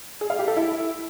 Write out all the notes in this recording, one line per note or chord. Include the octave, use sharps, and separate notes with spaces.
G#4
F5
G4
A4
E4